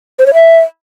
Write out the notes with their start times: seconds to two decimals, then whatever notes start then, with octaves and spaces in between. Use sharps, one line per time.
0.19 C5
0.26 C#5
0.34 E5